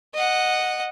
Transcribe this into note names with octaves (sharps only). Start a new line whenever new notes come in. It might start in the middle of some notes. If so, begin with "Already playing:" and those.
D#5 F#5